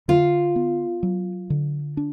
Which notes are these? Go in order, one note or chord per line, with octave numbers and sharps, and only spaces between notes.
D3 F4
B3
F#3
D3
D4